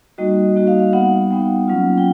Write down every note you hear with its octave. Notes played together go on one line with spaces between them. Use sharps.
G3 A#3 D#4 F#4 D#5
G3 A#3 D#4 F#4
F5
F5
G3 B3 D#4 F#5
G3 B3 D#4 G5
F#3 A#3 C#4 F4
G5